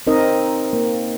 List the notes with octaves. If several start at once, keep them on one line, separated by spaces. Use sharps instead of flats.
C4 D#4 A#4 D#5
A#3